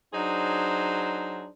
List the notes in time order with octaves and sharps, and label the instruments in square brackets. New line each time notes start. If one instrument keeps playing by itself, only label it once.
[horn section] F#3 D4 D#4 G#4 C5